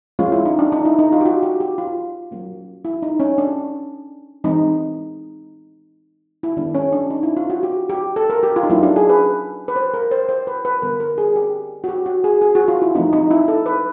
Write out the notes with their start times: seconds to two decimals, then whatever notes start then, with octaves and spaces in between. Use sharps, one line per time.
0.19 F3 G#3 C#4 F4
0.32 E4
0.45 D#4
0.59 D4
0.72 D#4
0.85 E4
0.99 D#4
1.12 F4
1.21 G4
1.26 F#4
1.43 G4
1.60 G4
1.78 F4
2.31 F#3 A#3 C#4
2.85 E4
3.02 D#4
3.20 C#4
3.38 D4
4.44 E3 G#3 C4 D#4
6.43 E4
6.57 D#3 G#3 B3 D4
6.75 C#4
6.92 D4
7.10 D#4
7.23 E4
7.37 F4
7.50 F#4
7.63 G4
7.90 G4
8.16 A4
8.30 A#4
8.43 G4
8.56 F4
8.63 D#4
8.70 F#3 A#3 C#4 E4
8.83 D4
8.96 G#4
9.09 B4
9.68 B4
9.76 C5
9.94 A#4
10.11 C5
10.29 C5
10.47 B4
10.65 B4
10.82 D3 G3 B3 A#4
11.00 A#4
11.18 G#4
11.36 G4
11.84 F#4
11.89 G4
12.06 F#4
12.24 G#4
12.42 G#4
12.55 F#4
12.68 F4
12.82 E4
12.95 F3 A3 C4 D#4
13.13 D#4
13.31 E4
13.48 A4
13.66 B4